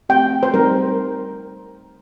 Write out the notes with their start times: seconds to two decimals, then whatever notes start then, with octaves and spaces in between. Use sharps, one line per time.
0.09 A3 C4 G4 G5
0.43 C5
0.54 G3 C4 D#4 A#4